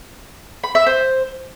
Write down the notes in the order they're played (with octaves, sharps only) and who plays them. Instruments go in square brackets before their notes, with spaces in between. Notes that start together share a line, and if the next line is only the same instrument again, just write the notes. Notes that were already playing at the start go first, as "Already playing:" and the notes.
[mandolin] B5
E5
C5